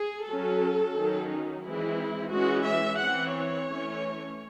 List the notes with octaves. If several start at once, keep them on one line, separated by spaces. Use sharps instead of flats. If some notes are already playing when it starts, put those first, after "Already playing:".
Already playing: G#4
F#3 C#4 A4
D#3 F#3 C#4
D#4
E3 G#3 C4 E4
E3 G#3 C#4 F#4
E5
E3 C4 F#5
C#5
E3 A3 C#4